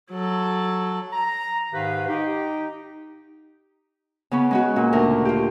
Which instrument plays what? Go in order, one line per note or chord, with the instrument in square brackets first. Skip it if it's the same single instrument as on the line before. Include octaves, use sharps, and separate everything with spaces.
[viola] F#3 A4
[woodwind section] A#5
G#2 D#3 G4 B4 F5
D#4 G4
[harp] C#3 B3 C#4
G#3 C#4 F#4
A#2
D2 A#4
F4 G4